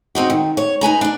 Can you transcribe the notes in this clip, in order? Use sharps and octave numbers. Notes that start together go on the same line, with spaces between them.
C4 D#4 F#4
D#3
C#5
D#4 B4 G#5 A#5
D4 D5